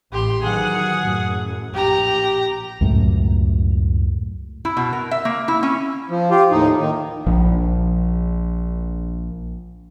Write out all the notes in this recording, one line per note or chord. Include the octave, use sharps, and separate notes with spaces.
A1 G4 C6
D#3 E3 F#3 G#4 F#5
F#2 A2
A#1 G4 A#5
C#2 F#2 A2
E4
B2
A#4
E5
A#3
E4
C#4
F3
F4 G4
D#2 A2 D#4
D#3
A#1 F3